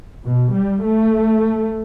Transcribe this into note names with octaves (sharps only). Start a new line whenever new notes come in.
B2
G3
A3